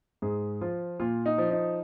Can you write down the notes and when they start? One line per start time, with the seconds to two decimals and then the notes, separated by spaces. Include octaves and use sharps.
0.22 G#2 G#4
0.61 F3 F4
1.00 A#2 F4
1.26 D#4
1.38 F3
1.51 D#4